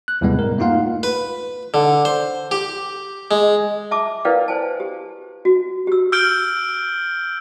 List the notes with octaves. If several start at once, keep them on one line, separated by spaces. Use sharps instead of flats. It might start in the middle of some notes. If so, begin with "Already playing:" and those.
F#6
D#2 A2 C3 G3 G#3 B3
F#2 A#4
A3 A#3 D#4 F4 F5 F#5
B4
D3
C5
G4
G#3
E5 A5 D6 D#6
E4 A#4 B4 D5 F5 G5
C5 G#5 A5
G4
F#4
G4 E6
E6 F6 G6 D7 G7